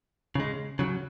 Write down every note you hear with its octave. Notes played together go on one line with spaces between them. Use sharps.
C#3 G#3
C#3 F#3